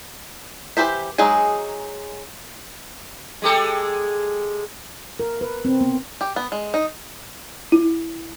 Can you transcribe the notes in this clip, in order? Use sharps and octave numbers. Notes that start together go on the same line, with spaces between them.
E3 G4 C5 E5
F#3 G#3 D#4 G#4
G#3 G4 A4
A#4
B4
C4
B3
G4
B3
G#3
D#4
E4